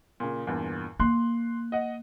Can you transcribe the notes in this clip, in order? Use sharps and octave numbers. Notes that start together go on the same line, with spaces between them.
A#2 C#3
E2 G2 A#2
A#3 C6 F#6
D#5 F#5